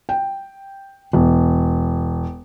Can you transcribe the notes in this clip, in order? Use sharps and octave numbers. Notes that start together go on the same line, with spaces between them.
G5
E1